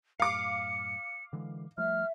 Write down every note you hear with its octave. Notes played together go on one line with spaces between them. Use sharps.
F#2 A2 F5 D6 C#7
D3 E3 G#3
F3 G3 A3 E5 F6